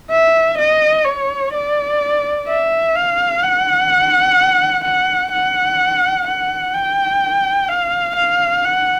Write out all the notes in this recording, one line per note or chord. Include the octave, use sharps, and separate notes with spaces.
E5
D#5
C#5
D5
E5
F5
F#5
F#5
F#5
F#5
G5
F5
F5
F#5